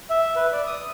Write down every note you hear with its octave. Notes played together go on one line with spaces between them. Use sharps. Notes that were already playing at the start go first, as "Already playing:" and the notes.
E5
B4
D5
D#6